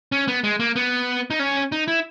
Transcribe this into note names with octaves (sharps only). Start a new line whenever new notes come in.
C#4
B3
G#3
A#3
B3
D#4
C#4
D#4
E4